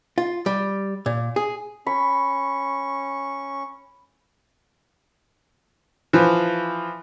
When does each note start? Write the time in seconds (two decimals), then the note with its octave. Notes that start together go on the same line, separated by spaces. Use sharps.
0.18 F4
0.46 G3
1.06 A#2
1.36 G#4
1.87 C#4 B5 C#6
6.13 E3 F3